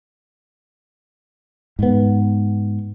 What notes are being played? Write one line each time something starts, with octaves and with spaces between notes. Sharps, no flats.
G#2 B3